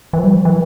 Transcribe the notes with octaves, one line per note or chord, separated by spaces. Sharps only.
E3
F3
G3
F3
E3